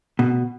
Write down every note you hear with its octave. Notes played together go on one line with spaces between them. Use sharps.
B2